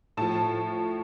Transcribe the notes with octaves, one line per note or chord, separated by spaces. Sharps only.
A2 F3 A5